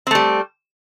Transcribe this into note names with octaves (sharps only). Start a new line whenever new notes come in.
G3 A3 C4